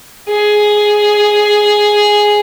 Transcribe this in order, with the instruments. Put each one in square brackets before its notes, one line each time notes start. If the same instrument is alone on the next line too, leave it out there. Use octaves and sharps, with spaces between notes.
[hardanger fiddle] G#4